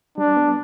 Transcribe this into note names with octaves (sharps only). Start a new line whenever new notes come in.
G3 D4
B3